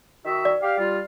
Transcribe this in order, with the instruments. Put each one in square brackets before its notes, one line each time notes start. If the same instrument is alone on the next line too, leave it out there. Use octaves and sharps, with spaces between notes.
[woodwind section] D#3 F#4 E5
[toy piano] D5
[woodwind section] G4 F5
G3 F4